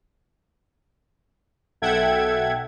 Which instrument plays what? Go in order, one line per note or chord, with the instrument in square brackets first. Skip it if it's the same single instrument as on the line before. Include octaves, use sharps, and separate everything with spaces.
[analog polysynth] B1 A4 E5 F#5 G5 G#6